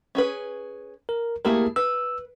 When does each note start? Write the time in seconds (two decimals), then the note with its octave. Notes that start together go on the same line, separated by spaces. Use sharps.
0.15 C#4 G#4 B4
1.09 A#4
1.45 A3 A#3 E4 G4 G#4 A#4
1.76 B4 E6